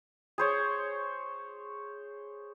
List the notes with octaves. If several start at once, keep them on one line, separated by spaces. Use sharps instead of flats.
G#4 C5 C#5